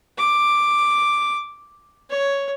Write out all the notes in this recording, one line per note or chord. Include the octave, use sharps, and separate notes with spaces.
D6
C#5